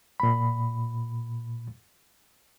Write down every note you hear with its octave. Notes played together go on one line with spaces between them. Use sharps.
A#2 B5